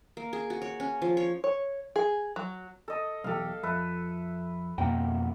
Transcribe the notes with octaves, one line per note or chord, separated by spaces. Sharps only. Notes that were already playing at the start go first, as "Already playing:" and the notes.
A#3
G#4
F#4
C#5
C#4
F3
C#5
C#5
G#4
F#3
A4 D#5
B1 E2 G4 A4 F5
F2 A4 B4 E5
F2 B2 A#3 F#5 G5 A#5